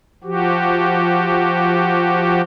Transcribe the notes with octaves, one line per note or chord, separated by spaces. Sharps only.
F3 F#4 G4